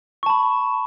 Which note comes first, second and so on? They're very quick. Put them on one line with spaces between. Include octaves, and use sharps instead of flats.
C#6 A5 B5